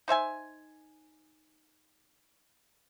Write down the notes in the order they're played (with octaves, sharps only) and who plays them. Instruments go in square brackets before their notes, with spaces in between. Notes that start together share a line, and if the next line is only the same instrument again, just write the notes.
[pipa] D#4 C5 E5 G#5